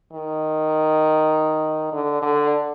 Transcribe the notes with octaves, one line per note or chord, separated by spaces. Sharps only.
D#3
D3
D3